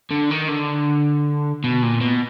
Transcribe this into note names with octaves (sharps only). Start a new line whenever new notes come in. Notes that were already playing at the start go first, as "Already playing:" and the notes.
D3
D#3
D3
B2
A#2
B2